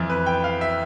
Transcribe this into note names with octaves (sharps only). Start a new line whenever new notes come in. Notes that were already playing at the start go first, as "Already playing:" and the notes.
Already playing: F2 E3
B4
G5
F5
E5